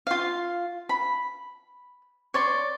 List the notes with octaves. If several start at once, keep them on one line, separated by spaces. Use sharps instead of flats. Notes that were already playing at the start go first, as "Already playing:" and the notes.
F4 F5
B5
C#5 D5 C6